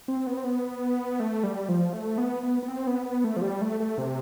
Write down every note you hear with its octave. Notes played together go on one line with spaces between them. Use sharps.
C4
B3
C4
B3
A3
G3
F3
A3
B3
B3
B3
C4
B3
B3
A3
F3
G3
A3
A3
C3